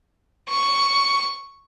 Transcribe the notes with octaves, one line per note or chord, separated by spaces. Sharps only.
C#6